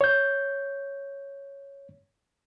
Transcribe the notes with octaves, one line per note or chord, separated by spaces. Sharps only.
C#5 G6